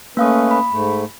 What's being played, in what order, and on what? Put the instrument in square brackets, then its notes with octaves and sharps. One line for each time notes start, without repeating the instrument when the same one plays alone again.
[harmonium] A3 C#4 B4 [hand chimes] A#3 F5 D#6
[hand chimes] B5
[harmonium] G#2 A3